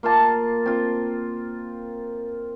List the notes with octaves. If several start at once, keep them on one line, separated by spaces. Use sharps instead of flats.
A#3 F4 F5 A5
C4 F4